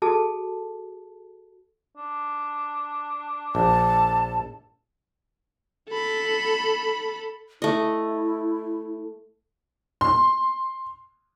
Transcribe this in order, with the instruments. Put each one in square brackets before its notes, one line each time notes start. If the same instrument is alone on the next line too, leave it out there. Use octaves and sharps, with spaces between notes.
[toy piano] F#4 G#4 A4 A5
[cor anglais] D4
[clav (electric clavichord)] A#1 [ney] A5
[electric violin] A4 B5
[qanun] A3 D#5 [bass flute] E4
[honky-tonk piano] C6